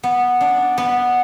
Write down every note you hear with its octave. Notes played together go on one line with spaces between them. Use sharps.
B3
D4
B3